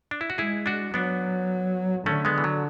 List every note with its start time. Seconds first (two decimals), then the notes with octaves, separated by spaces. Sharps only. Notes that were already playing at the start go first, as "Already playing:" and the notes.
0.11 D4
0.21 E4
0.30 F#4
0.38 G#3 E4 G#4
0.66 D4 F#4
0.94 F#3 B3 D4
2.06 D3 A3 C#4
2.25 G#3 B3
2.38 E3
2.44 F#3